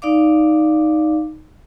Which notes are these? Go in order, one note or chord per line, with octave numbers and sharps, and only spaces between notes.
D#4 D5 F5 D6